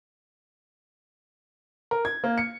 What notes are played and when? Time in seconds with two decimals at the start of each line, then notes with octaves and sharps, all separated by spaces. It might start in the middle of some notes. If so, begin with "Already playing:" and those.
1.91 A#4
2.05 G#6
2.24 A#3
2.38 C#7